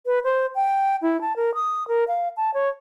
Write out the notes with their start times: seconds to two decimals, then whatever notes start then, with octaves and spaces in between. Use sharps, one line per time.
0.06 B4
0.24 C5
0.55 G5
1.02 E4
1.21 A5
1.36 A#4
1.55 D#6
1.88 A#4
2.08 F5
2.37 A5
2.54 C#5